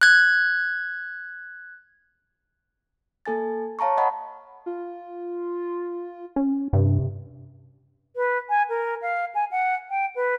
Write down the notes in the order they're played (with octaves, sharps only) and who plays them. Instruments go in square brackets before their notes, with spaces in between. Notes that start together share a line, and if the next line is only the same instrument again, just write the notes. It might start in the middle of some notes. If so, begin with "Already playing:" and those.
[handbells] F#6 G#6
[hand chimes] A#3 A4 G#5 A6
C#5 F5 A5 A#5 C#6
D#5 F#5 B5
[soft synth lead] F4
[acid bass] C#4
[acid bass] G2 [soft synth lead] C3
[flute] B4
G#5
A#4
F5
G#5
F#5
G5
B4